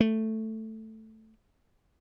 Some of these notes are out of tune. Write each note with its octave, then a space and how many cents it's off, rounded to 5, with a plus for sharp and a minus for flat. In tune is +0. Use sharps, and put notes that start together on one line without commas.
A3 +5